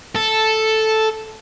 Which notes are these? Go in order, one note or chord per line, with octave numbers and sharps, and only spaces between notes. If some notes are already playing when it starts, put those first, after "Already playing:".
A4